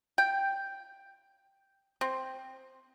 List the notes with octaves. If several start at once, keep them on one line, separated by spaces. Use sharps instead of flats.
G5
C4